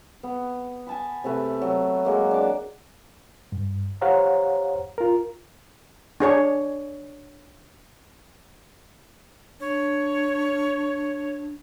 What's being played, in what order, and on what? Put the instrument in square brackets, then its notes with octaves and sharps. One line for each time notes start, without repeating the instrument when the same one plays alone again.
[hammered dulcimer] B3
G#5 A5 B5
C3 A3 B4
F#3
F#3 G#3 A#3
D4 D6
[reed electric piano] G2
G4 C5 C#5 F5 F#5 A#5
F4 A#4
[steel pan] D4 G#4 C#5
[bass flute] D4 [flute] C#5